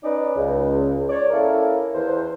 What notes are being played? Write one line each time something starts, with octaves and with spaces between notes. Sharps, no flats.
C#4 D#4 B4 D5
C#2
C#5 D5
A#3 C#4 E4 A4 A#4
E2 C5